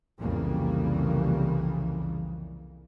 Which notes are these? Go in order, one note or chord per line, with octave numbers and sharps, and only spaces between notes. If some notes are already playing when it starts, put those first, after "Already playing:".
C2 F2 C#3 E3 G3 A#3